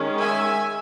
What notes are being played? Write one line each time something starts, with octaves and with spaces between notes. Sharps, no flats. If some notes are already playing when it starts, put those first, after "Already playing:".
Already playing: D#3 G#3 C#4
E5 G#5